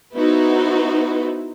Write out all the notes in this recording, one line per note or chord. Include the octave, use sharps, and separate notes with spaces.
B3 D#4 E4 F#4 B4 C5